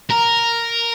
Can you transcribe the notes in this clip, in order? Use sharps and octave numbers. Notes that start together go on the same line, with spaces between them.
A#4